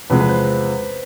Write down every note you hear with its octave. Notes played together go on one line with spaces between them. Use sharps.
E2 C3 F3 G#3 B4
B4
C5